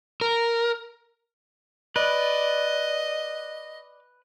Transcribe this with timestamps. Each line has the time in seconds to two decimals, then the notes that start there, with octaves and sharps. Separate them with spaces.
0.21 A#4
1.96 B4 D5 D#5